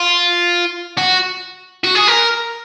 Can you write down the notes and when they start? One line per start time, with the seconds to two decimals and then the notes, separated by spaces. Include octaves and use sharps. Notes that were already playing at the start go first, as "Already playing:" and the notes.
Already playing: F4
0.98 F#4
1.84 F#4
1.95 G#4
2.08 A#4